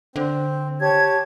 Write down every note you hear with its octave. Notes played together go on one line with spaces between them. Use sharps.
D3 C4
G4 C#5 A5 G#6